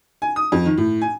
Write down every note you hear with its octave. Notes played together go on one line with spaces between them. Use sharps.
G#5
D#6
F2
D#3
A2
G#5